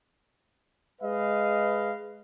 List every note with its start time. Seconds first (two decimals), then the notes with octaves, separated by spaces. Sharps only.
1.02 G#3 B4 D#5 F5